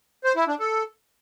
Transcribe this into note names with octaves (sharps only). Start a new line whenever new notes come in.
C5
E4
D4
A4